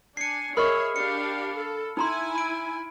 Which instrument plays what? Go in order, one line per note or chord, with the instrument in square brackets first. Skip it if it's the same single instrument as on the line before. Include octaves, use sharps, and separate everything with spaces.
[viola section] D4 G#5 [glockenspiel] C7 C#7
[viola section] G#4 C#5 E5 [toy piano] A#4 D#5 C#6 [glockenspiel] B5 F6
[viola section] D4 G4 F5 [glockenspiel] C#7
[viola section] A4
[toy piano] D#4 A#5 C6 [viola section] E4 G#5
[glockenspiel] B5 D7